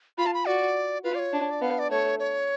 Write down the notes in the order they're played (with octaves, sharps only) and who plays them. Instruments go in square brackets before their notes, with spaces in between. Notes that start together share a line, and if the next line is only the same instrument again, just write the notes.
[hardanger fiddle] F4 [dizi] B5
[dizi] A5
B5
[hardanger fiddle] F#4 [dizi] D5
[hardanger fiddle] F4 [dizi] B4
[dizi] D5
C#5
[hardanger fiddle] D4
[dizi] D5
[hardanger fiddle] B3 [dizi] F5
[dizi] D5
[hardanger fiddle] A3 [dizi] C#5
[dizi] C#5